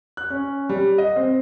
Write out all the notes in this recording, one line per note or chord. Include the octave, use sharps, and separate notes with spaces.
F#6
C#4
G3
D#5
C4